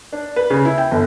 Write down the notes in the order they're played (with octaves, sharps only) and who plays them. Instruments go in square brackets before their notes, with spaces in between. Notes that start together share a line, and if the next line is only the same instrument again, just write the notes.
[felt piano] D4
B4
C#3
E4
G5
G1